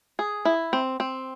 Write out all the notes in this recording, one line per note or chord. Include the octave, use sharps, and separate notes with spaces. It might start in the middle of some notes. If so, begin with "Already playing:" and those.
G#4
E4
C4
C4